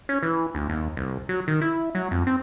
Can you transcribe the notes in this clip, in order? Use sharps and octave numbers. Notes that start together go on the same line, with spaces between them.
C#4
E3
D2
D#2
C2
F#3
D#3
E4
F#3
F2
C4